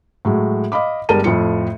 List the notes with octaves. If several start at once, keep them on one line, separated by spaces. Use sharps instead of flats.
A2 F#3 G#3
D#5 F5 B5 D6
G1 G3 G#3 A#4 A5 D#7
F2 A2 F4 C#7